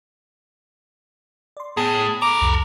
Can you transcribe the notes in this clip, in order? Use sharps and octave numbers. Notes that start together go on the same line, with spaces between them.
D5 C6
A2 B3 G#4
A4 A#5 D6
C2 F2